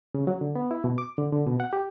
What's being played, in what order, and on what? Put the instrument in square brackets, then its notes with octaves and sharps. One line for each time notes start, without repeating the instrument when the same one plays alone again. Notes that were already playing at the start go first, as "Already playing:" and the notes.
[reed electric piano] C#3
F#3
D3
B3
E4
B2
D6
D3
D3
B2
F#5
G4